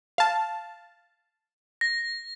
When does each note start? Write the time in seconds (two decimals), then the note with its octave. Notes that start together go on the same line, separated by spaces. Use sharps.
0.18 F5 A5
1.81 A#6